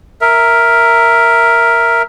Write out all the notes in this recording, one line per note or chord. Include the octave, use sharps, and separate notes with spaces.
A#4 E5